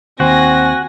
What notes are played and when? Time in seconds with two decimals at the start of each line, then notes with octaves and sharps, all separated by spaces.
0.20 D#2 C4 F#4 G#5 A#6